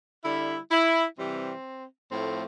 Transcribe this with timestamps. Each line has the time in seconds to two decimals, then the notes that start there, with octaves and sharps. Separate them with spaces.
0.24 D3 G3 E4
0.71 E4
1.18 C3 E3 G3 C4
2.11 A2 F3 A3 C4